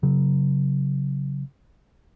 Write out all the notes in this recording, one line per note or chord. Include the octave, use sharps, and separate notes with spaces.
C#3 F#3